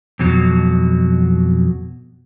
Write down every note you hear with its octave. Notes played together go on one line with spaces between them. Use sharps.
F2 B2 F#3